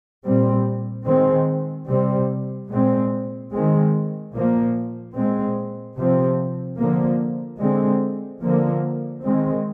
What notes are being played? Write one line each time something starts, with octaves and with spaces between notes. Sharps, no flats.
A#2 G3 C4
D#3 G#3 C4
C3 G3 C4
A#2 G#3 C4
D#3 G#3 C4
A#2 F3 A#3
A#2 G#3 C4
C3 F3 C4
D3 F3 A#3
D3 G#3 C4
D3 F3 A#3
D#3 G#3 C4